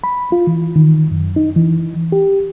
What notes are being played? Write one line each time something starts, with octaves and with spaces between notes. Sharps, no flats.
B5
F4
E3
D#3
F#2
D#4
E3
G4